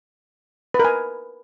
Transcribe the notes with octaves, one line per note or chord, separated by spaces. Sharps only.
B4
A#4
G#5